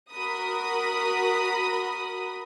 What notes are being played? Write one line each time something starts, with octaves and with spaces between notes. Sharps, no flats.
F#4 A#4 B5 D#6